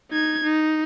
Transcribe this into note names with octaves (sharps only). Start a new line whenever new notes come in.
D#4 G#6
D#4